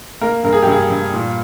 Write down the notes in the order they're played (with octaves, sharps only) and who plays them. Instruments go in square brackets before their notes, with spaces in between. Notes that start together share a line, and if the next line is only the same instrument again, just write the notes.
[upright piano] A#3 A#4
G2 A#4
G#4
G4
G2 G#4
G2
A#2